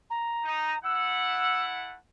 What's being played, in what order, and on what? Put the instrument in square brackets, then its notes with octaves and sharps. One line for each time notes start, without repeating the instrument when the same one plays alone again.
[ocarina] A#5
[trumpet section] D#4
[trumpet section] A3 E4 F#5 [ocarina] E6